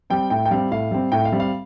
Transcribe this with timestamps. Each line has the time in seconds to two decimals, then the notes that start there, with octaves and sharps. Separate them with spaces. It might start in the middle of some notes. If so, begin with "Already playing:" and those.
0.10 G3 C4 G5
0.30 A2 G5
0.45 G5
0.51 G3 C4 F5
0.71 A2 F5
0.91 G3 C4
1.12 A2 G5
1.25 F5
1.32 G3 C4
1.40 F5